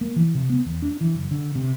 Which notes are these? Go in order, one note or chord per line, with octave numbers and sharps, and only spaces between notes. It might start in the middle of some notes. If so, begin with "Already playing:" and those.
A#3
E3
C3
B3
E2
D4
E3
F#1
D3
C3